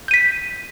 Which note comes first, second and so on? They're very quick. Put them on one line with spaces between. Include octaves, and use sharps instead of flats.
G6 D#7 B6